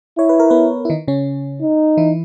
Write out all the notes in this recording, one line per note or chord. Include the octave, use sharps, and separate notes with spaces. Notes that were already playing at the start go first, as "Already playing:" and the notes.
E4 C#5
B4
A#4
B3 B4
E4
D#3 D#4
C#3 C#4
D#4
E3 E4